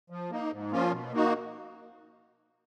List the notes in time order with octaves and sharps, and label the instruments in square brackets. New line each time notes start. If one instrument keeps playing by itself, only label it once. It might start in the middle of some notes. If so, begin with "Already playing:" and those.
[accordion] F3
A#3 D#4
G#2
F3 A#3 C#4 F4
B2
A#3 D#4 F#4